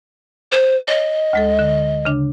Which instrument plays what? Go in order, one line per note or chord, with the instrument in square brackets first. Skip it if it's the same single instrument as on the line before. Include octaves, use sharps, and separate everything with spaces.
[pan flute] C5
[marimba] C#5 [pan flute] D#5
[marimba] D2 G#3 A4
D3
C#3 D4